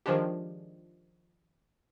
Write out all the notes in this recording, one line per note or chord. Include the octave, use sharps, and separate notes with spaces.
D#3 F3 G#3 D4 G4